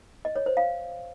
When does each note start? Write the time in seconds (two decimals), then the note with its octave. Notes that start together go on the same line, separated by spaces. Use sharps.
0.25 D#5
0.36 C#5
0.46 C5
0.57 F5